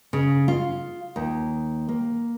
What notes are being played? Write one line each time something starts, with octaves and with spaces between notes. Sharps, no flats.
C#3
F4
D#2
A#3